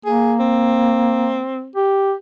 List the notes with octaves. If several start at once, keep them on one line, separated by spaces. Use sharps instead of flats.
A#3 G#4
C4
G4